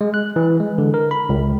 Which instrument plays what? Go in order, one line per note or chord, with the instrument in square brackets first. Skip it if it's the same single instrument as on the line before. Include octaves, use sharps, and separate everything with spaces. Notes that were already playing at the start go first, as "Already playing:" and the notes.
[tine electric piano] G#3
F#6
E3
G#3
D3
A#4
B5
C#2